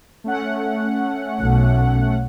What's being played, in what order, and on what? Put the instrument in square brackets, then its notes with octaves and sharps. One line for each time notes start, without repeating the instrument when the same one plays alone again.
[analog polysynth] A3 C#4 F#5
[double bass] B1